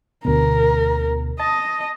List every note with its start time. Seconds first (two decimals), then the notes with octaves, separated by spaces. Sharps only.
0.25 D2 B2 A#4
1.39 D#5 A5